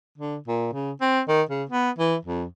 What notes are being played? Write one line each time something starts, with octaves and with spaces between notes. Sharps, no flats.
D3
A#2
C#3
C4
D#3
C#3
B3
E3
F2